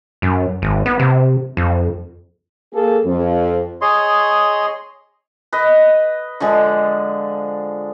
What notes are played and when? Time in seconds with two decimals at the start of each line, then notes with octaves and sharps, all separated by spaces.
0.22 F#2
0.62 G#1
0.86 B3
0.99 C3
1.57 F2
2.73 A#3 G#4 A4
3.05 F2
3.81 G#4 C#5 D#5 C6
5.53 B4 D#5
6.40 D3 F3 G#3